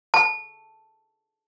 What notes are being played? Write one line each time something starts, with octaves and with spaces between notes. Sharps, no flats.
A5